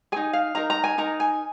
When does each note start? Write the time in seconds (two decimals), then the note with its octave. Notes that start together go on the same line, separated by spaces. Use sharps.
0.12 D#4 G#4 G#5
0.33 F5
0.55 D#4 A#4 A#5
0.70 A#5
0.84 G#5
0.98 D#4 A#4 A#5
1.20 G#5